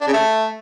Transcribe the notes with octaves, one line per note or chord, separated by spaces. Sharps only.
D4
C#3
A3